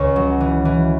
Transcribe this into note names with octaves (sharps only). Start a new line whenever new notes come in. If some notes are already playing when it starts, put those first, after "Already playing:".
Already playing: C#2 C#3 C#5
F#3
E3
E3